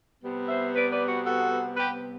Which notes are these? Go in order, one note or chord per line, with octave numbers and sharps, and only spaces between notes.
C3 G3 B3
C5 E5
B4 D5
B4 D5
F#4
F#4 A4
G4 B4